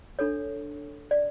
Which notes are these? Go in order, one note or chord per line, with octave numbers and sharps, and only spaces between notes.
D4 A4 C#5
D5